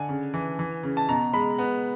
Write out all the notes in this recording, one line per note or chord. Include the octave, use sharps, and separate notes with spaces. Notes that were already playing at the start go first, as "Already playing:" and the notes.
Already playing: D3 G#5
C#3
E3
E3
C#3
A5
B2 A#5
G#3 B5
B3